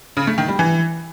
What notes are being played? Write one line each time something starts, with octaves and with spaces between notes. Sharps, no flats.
C#3
A3
D#3
G3
E3